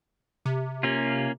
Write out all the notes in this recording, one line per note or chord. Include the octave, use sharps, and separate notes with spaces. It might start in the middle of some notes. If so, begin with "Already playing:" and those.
C3
A#3 C#4 F4